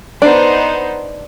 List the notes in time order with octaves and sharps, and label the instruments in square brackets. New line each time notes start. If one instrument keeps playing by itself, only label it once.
[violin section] B3 D#4 C5 [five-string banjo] D4